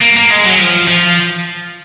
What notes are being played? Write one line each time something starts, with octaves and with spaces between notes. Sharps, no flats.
A#3
A#3
G#3
F#3
F3
F3